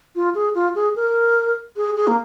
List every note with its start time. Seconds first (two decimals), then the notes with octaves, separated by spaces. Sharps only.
0.15 F4
0.35 G#4
0.55 F4
0.75 G#4
0.96 A#4
1.76 G#4
1.96 G#4
2.07 A#3